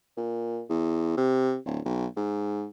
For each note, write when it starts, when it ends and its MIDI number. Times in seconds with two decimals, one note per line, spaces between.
0.17 0.62 46
0.70 1.16 40
1.17 1.57 48
1.66 1.80 26
1.85 2.06 35
2.17 2.66 44